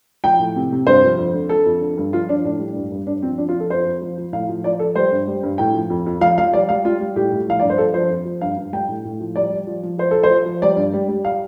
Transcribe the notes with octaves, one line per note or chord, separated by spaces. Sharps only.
F3 G5
A2
C3
C3
G2 C5
F3
F2
D3
D3 A4
F2
D3
G2
F3 F4
F3 D4
A2 D4
G3
G2
G2
G2 D4
F3 C4
F3 D4
F4
F3
A4
F2 C5
F2
F3
F3
A2 F5
F3
F3 D5
F3 A4
G3 C5
G2
G3
G2
A2 G5
F3
F2
F2
F3 F5
F3 F5
G3 D5
G3 F5
G3 F4
G3
A2 G4
A2
F3 F5
G2 D5
C5
F3 A4
F3 C5
F2
F3
G2 F5
G2
G3 G5
A2
A2
F3
G3 D5
G3
F3
F3
F3 C5
F3 A4
C5
F3
F3
G3 D5
G2
G3
G3
F5